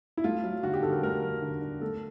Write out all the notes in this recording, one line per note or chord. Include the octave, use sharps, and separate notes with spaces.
E4
A3 F4
F#3
D3 F#4
G4
D3 A4
A#4
A3 A#4
F#3
D3
D3
A3 A4